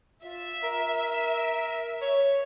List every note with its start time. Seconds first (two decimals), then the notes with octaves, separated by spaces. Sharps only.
0.24 F4 E5
0.63 A#4
2.02 C#5